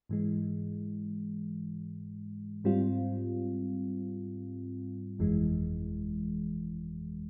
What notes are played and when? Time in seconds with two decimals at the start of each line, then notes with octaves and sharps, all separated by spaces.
0.09 G#2 E3 G#3
2.64 G#2 G3 C4 F4
5.19 G1 F2 E3 G#3